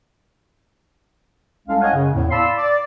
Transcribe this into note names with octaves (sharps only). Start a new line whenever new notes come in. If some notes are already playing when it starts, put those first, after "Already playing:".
C2 G#3 C#4 A4 F5
C#5 D#5 F5 F#5 G#5
F#2 C#3
E2 A2
D5 F5 A5 B5 C6 E6
D5